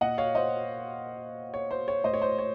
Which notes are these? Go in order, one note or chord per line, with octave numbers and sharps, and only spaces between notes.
A#2 D#5 F#5
C#5 F5
C5 D#5
C#5
C5
C#5
A2 C5 D#5
C#5
C5
C#5